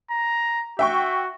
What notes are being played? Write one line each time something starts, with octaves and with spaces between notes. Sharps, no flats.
A#5
F#4 E5 G5 C#6